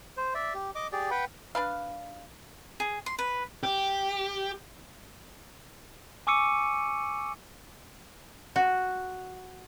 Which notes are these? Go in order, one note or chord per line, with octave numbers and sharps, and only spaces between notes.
C5
D5 E5
G4
D#5 D6
G4 G#4 D5
B4 F#5 G5 B5
D4 B4 F5
G#4
C6
B4
G4
G#5 C#6 D6 E6 C#7 D#7
F#4